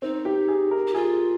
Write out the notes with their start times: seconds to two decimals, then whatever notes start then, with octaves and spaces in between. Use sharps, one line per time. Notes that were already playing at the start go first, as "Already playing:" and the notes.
0.02 C4 D#4
0.25 G4
0.48 G#4
0.71 A#4
0.87 G4
0.94 F4 G#4